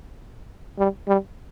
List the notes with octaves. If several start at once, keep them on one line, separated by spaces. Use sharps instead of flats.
G3
G3